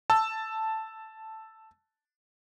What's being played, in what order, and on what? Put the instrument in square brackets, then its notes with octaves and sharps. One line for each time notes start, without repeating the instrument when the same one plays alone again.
[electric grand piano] A5 E6